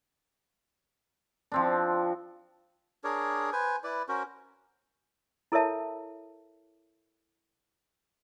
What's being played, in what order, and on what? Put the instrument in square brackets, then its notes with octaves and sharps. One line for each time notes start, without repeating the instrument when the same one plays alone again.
[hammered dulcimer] F3 C4 D4
[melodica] D4 G#4 A#4 C#5
B4 C5 G#5
E4 B4 D5
C#4 F#4 A#4 C5
[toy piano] E4 A4 A#4 C#5 E5 A5